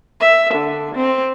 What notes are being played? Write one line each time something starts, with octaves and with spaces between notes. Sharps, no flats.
E5
D3
C4